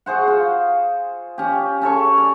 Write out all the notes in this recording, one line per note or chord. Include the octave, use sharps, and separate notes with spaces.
F#4 G#4 C5 F#5
F4
C#4 G4
C#4 A4 C#5 C#6
D5